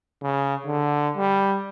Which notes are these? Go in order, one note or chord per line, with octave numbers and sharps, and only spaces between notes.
C#3
D3
G3